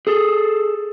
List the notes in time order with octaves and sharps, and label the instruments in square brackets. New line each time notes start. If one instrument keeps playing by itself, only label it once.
[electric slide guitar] G#4 A4